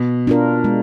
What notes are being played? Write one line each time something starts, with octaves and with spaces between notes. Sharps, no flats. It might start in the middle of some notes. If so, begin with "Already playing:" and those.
Already playing: B2
D4 F4 A#4
G#3